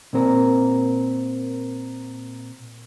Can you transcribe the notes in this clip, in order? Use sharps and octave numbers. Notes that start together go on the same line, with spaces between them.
A#2 C4 A#4